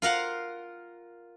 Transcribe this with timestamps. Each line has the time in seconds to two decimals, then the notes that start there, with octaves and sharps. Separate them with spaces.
0.02 F4 A#4 F5 F#5